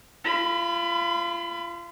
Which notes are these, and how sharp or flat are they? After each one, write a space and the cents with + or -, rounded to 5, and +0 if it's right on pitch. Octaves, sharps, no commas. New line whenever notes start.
F4 -30 B5 +20